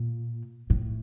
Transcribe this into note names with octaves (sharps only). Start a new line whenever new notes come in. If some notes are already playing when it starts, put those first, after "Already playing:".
Already playing: A#2
A2